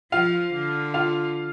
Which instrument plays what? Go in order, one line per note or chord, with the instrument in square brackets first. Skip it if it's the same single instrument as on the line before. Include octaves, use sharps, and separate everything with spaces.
[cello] F3 [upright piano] F4 F5
[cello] D3
[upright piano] F4 F5